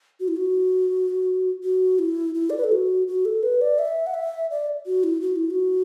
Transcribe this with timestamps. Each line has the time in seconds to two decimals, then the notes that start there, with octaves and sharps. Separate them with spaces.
0.20 F#4
0.28 E4
0.36 F#4
1.63 F#4
1.99 E4
2.35 E4
2.50 D5
2.58 B4
2.64 A4
2.72 F#4
3.08 F#4
3.25 A4
3.43 B4
3.61 D5
3.79 E5
4.07 F#5
4.14 E5
4.51 D5
4.86 F#4
5.04 E4
5.21 F#4
5.36 E4
5.51 F#4